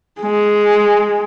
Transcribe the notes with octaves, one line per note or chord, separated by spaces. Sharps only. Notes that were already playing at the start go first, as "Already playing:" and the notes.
G#3